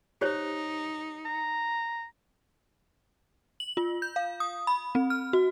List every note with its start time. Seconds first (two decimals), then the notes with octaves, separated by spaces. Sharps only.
0.21 D#4 G4 C5 C#5
1.26 A#5
3.60 F#7
3.77 F4
4.02 G6
4.16 F5
4.40 D#6
4.67 B5
4.95 C4
5.10 F6
5.33 F#4